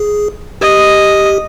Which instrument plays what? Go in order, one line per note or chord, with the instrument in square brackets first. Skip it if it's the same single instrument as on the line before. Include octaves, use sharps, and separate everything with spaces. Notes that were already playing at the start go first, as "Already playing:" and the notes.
Already playing: [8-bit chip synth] G#4
[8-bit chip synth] G4 [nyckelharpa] D#5